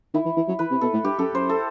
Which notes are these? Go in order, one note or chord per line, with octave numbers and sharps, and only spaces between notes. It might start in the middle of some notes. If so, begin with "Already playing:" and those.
D#3 E4
E3
E3
F#3
E3 B4
C3
B2 A4
A2
G2 G4
F#2 A4
F#2 C5
A4